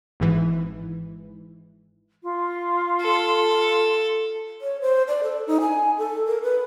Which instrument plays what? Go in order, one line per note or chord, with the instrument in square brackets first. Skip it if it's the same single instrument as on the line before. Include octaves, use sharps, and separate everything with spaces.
[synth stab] G#1 G#2 E3
[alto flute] F4
[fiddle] A4
[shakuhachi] C#5
C5
D5
A4
D#4
G#5
A4
A#4
B4